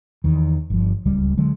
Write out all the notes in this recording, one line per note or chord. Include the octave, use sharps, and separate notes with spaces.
E2 D#3
G1 F3
D1 C#2 G3
D3 F#3 G#3